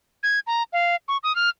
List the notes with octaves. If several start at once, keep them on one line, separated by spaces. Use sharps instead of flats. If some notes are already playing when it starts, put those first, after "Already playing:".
G#6
A#5
F5
C#6
D#6
F6